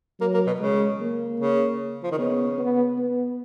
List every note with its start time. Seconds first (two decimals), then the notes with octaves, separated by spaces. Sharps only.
0.20 F#3 A#3
0.34 A#3
0.47 B2
0.60 C#3 G#3
1.00 A#3
1.40 C#3
2.04 F3
2.12 D#3
2.18 C#3 B3
2.58 B3
2.98 B3